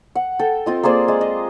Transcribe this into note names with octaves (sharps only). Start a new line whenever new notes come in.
F#5
A4 G5
C4 F4 D#5
A#3 G#4 C5 D5
G#3
D#5